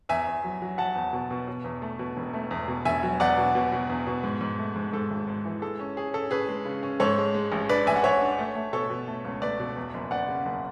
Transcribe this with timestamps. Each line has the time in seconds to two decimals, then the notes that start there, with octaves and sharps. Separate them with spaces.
0.09 E2 E5 G#5
0.27 E2
0.44 F#3
0.62 F#3
0.78 F#3 F#5 A5
0.95 E2
1.13 B2
1.31 B2
1.48 B2
1.64 E2
1.82 A3
1.99 B2
2.17 E1
2.33 A3
2.51 E2
2.68 B2
2.85 E1 E5 G#5
3.03 F#3
3.20 E2 D5 F#5
3.38 B2
3.55 B2
3.72 B2
3.89 E2
4.07 B2
4.23 G#2
4.41 G#2
4.59 A3
4.76 G#2
4.93 G#2 A4
5.10 G#1
5.27 G#2
5.45 E3
5.62 G#3 A4
5.79 C#4
5.97 C#4 G#4
6.13 C#4 A4
6.31 C#4 G#4 B4
6.48 G#3
6.65 C#3
6.83 C#4
7.00 G#2 A4 C#5
7.18 G#3
7.34 G#3
7.52 A1
7.69 D4 B4 D5
7.87 A1 E5 G#5
7.96 F#5
8.03 A1 C#5 E5
8.22 D4
8.39 A3
8.55 A3
8.73 B2 A4 C#5
8.90 B2
9.08 A3
9.25 C#2
9.42 A3 B4 D5
9.60 B2
9.77 E2
9.94 F#1
10.11 F#1 D5 F#5
10.28 C#3
10.46 F#1